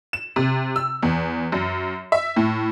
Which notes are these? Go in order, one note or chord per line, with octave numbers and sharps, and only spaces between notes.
E7
C3
E6
E2
F#2
E5
A2